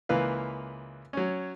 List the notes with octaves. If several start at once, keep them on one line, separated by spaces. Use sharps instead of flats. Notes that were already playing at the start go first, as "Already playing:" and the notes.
C#2 E3 A#3 B4 F5
F#3 C#4